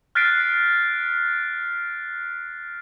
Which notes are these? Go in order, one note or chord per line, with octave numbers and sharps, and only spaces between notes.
F6 F#6 A6 B6 C7 D7